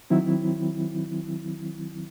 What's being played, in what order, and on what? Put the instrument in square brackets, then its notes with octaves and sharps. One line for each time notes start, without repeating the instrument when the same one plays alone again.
[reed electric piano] D#3 F#3 C4 E4